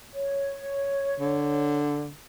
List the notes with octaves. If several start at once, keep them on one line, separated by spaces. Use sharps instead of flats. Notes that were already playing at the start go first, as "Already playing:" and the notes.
C#5
D3